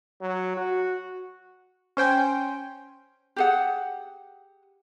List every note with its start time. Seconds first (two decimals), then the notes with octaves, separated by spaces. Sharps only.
0.21 F#3
0.57 F#4
1.97 C#4 C5 G5 G#5
3.36 G4 G#4 F#5